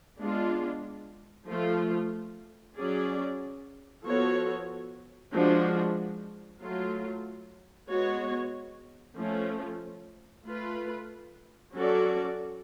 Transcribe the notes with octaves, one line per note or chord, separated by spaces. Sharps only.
G#3 B3 D4 F4
F3 A3 F4
F#3 C#4 G#4 D5
F3 B3 F#4 A4 C#5
F3 G#3 D4 F#4
F#3 A3 F4
G#3 B3 F#4 C#5
F3 A3 C#4
A3 F4 B4
F#3 C#4 F#4 A4 D5